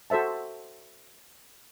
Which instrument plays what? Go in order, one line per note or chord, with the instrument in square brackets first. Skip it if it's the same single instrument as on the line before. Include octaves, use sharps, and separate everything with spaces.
[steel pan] F#4 A4 C5 E5 A5